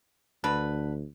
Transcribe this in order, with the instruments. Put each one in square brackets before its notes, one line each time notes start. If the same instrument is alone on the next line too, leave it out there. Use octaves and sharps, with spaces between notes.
[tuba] D2 [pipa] D3 B4